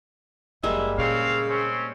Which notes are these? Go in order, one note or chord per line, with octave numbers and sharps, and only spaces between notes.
F#1 F#2 G3 G#3 A#3 E5
A#2 C#3 C4 F5
C4 C#4